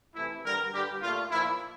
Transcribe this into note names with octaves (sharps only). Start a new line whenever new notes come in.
C3 E3 A3 E4
G2 D3 G3 A#4
G2 D3 G3 G4
A#2 A3 F4
A#2 F3 A#3 E4